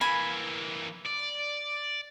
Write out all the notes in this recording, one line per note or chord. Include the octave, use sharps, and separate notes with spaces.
E3 A#3 G#5 B5
D5